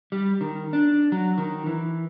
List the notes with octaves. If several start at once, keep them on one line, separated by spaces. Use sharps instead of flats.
G3
D#3
D4
F#3
D#3
E3